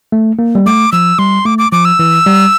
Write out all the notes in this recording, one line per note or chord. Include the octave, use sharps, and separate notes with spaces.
A3
A#3
G3
A3 D6
F3 E6
G3 C6
A3 D6
D6
F3 D6
E6
E3
G3